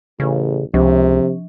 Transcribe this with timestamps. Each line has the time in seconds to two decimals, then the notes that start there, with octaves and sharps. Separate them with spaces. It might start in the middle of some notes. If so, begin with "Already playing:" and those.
0.20 A1 C#3
0.74 C#2 C3 F3